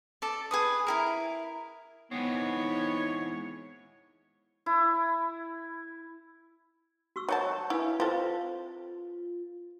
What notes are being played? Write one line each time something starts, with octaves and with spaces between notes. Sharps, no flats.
A4 D5
G#4 B4 D#6
E4 G#4 A#4
E3 G#3 B3 C4 D#4 C#5
E4
F#4 C#6 E6
F#3 F#4 C#5 A5 C#6 G6
E4 B4 F5 G#5
C4 F4 A4 B4 C5 F5